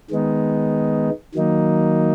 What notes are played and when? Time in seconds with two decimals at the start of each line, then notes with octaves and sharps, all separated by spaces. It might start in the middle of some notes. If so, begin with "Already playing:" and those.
0.10 D#3 G#3 B3 D#4
1.34 D#3 F#3 A#3 D#4